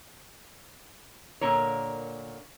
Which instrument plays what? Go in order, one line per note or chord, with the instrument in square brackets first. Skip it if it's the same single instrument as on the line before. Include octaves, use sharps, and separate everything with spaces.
[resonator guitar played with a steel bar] A#2 D3 A#3 A#4 C#5